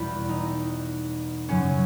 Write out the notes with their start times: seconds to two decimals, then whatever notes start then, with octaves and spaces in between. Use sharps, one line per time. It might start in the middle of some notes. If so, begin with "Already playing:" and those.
Already playing: E2 B2 G3 E4
0.29 D#4
1.49 F#2 C#3 F#3 C#4